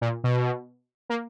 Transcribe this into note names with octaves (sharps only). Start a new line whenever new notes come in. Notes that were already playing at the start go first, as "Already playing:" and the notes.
A#2
B2
A#3